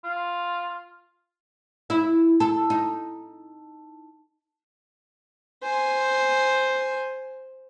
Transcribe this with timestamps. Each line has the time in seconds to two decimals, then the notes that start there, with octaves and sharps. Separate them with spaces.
0.04 F4
1.90 E4
2.40 A4
2.70 D#4
5.63 C5 G#5